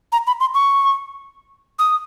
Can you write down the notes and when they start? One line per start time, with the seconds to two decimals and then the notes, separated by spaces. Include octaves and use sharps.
0.12 A#5
0.27 B5
0.40 C6
0.54 C#6
1.79 D#6